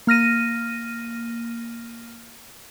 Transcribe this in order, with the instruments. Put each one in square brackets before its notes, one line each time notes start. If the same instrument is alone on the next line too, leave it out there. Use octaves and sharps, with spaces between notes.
[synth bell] A#3 F6 A#6 D#7